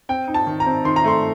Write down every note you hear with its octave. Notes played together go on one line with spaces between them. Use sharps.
C4 G5
D#4
A5
D#3
A#5
C4
D#3 C6
A#5
A3 C6